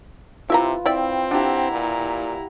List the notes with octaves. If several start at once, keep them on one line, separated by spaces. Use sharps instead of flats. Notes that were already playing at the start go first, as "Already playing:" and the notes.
C3 E4 F4 B4 E5 A#5
C4 E4 D5 E5 G5
D4 E4 G4 F5 F#5 A#5
A#2